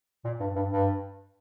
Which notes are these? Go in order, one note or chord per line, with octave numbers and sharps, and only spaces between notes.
A#2
G2
G2
G2